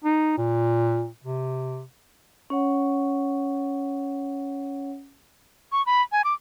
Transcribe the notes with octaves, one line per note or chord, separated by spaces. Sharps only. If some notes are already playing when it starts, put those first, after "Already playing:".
D#4
A#2
C3
C#4 C#5 F#5
C#6
B5
G#5
D6